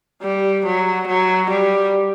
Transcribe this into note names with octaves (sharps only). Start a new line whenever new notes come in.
G3
F#3
F#3
G3